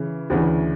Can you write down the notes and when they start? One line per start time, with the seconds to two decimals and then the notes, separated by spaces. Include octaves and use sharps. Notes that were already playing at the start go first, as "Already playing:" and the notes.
Already playing: C#3 E3
0.30 D2 C#3 E3